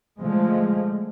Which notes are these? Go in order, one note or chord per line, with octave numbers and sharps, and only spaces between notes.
D3 F3 G#3 A3